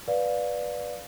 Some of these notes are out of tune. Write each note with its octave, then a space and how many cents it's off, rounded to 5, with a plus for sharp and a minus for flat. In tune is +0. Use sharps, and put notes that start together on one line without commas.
B4 +0 D5 +0 F5 +15